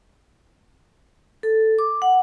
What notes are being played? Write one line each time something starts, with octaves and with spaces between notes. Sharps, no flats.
A4
D6
F#5